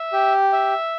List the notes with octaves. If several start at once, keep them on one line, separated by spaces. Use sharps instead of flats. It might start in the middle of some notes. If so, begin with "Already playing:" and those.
Already playing: E5
G4
E5